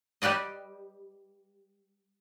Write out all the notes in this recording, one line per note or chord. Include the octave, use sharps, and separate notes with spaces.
G3 G4 B4 D5 D#5